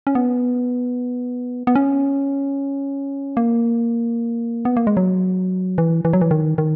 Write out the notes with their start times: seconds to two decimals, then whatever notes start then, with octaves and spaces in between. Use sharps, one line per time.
0.07 C#4
0.15 B3
1.67 B3
1.75 C#4
3.37 A#3
4.65 B3
4.77 A#3
4.87 G#3
4.97 F#3
5.78 E3
6.05 E3
6.13 F#3
6.21 E3
6.31 D#3
6.58 D#3